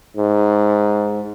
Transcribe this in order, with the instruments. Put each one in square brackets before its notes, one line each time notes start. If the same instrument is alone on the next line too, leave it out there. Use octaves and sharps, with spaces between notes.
[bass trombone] G#2